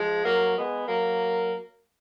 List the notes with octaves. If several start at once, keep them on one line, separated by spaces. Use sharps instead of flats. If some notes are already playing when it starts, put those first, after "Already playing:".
Already playing: F3 G#3
F#3 A#3
G#3 B3
F#3 A#3